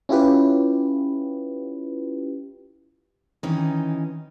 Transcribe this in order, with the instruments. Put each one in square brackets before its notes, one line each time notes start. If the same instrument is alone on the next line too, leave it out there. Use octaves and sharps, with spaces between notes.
[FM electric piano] C#4 E4 F4 G4 B4
[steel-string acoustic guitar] D#3 E3 C#4 D#4